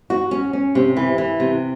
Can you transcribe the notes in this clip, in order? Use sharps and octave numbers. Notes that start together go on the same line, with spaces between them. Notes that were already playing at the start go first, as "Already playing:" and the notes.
F#4
C#4
C#4
C3
E3
E3
C3